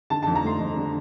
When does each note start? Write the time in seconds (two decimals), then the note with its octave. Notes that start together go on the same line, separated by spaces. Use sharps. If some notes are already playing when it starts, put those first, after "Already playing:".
0.10 D3 A5
0.23 A5
0.27 F2
0.35 A#5
0.43 A3 C6
0.59 F2
0.76 D3